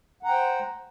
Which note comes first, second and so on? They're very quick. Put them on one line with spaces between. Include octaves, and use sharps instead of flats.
F#5 A#5 G5 C5